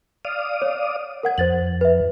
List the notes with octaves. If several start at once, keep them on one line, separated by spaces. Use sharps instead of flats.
D5 F5 D#6
C#5
A#4 F#5 G#6
F2 C5 A6 F#7
B4 E5